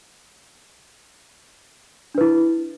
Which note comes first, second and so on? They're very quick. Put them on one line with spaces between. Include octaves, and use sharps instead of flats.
D4 B4 E4